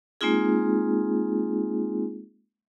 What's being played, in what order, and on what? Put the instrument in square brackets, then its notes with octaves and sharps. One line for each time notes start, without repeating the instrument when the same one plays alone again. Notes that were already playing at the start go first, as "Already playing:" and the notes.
[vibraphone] G#3 A#3 C4 D#4 F4 G#4